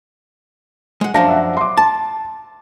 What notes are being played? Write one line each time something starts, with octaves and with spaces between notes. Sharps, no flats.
G#3 F#5
F#2 F3 D4 F5 A5 A#6
E5 F#5
C6 D6
A5